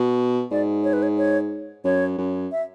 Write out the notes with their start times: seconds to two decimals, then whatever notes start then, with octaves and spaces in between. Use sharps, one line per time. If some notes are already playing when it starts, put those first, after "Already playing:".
Already playing: B2
0.51 G#2 D5
0.84 C#5
0.93 B4
1.02 C#5
1.18 C#5
1.84 F#2 C#5
2.18 F#2
2.52 E5